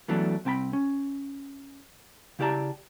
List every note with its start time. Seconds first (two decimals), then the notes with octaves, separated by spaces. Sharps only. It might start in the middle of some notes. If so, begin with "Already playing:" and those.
0.08 E3 F#3 A3 B3 D4
0.45 C2 C4 G5 A5 B5
0.73 C#4
2.39 C#3 E4 G4 D5 A5 A#5